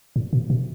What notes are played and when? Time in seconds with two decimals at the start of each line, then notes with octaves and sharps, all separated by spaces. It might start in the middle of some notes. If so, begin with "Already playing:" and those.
0.16 A2
0.33 B2
0.50 B2